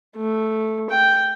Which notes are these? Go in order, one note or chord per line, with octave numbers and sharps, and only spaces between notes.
A3
G5